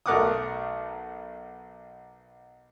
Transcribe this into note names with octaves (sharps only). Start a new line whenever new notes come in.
B1 A3 A#4 F#5 D6 D#6